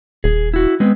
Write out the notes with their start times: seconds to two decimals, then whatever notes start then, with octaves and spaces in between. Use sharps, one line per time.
0.24 D#1 G#4
0.54 E4 F#4
0.80 G#3 B3 C4